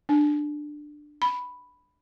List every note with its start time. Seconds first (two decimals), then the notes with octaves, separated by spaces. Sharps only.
0.09 D4
1.22 B5